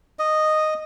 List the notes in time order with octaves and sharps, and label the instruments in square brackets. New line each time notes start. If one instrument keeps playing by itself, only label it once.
[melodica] D#5